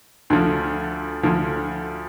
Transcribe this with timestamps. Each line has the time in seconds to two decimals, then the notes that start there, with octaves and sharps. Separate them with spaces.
0.30 D2 D3 F3
1.23 D2 D3 F3